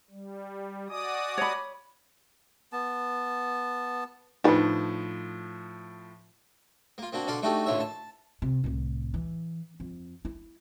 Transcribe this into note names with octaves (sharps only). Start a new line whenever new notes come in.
G3
F#4 D5 D#5 G#5 D6 D#6
C#5 B5
B3 A5
A2 F3 D4 D#4 B4
A#3 F4
A#3 C4 D4 F#4
B2 D3 A4 D5 F5 C6
A3 D4 D#4 F#4 G4 A4
A1 A#2 D3 E3 C#5 E5
A5
C3
C2 A2
E3
F2
E4